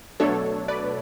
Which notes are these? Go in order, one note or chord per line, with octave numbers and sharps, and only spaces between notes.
B2 F#3 A3 D4 A4 C#5
B4 D5